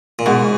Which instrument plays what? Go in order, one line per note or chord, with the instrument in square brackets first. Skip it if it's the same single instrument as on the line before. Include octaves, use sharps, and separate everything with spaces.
[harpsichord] A#2
[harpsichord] G#2 [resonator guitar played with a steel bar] B2